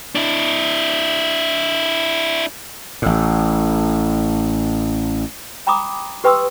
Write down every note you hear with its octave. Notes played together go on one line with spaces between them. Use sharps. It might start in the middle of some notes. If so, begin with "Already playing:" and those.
D4 E4
A1 A2
G5 A#5 B5 D6 D#6
G4 B4 G5 C6 D#6 E6